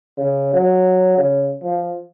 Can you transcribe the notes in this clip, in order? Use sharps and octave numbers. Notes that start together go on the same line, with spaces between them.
C#3
F#3
C#3
F3